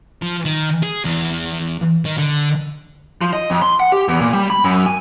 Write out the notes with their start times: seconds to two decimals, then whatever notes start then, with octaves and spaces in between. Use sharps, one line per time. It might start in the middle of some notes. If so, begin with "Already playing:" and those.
0.22 F3
0.45 D#3
0.83 G#4
1.05 E2
2.05 D#3
2.18 D3
3.21 F3
3.33 D#5
3.50 F2
3.62 C6
3.80 F#5
3.92 G4
4.09 E2
4.21 A#2
4.33 G3
4.50 B5
4.64 F#2
4.86 G#5